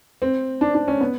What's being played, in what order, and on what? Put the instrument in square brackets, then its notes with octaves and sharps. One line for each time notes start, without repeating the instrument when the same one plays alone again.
[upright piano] C4
D4
D4
C#4
B3